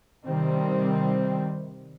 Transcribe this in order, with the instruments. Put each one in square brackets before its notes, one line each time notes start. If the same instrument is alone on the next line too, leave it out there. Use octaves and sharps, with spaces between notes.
[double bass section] C3 D#3 G3 C4